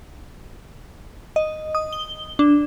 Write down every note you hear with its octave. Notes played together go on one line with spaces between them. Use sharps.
D#5
D#6
G7
D4